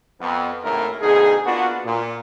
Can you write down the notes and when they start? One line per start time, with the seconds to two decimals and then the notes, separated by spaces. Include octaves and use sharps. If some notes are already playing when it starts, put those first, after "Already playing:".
0.21 F2 B3
0.64 G#1 D#2 A2 C#3 E4 A#4
1.01 D2 B2 D#4 G#4
1.45 A#3 B3 D4 F4 F#4
1.85 A#2